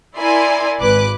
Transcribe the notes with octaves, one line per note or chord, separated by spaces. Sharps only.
E4 A#4 D5 G#5 C6
G#1 B4 D6 F#6